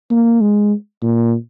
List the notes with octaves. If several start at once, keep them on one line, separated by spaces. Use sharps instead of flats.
A#3
G#3
A#2